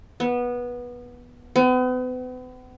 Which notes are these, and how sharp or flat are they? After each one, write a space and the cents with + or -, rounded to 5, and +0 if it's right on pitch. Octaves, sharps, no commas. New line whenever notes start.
B3 -15
B3 +40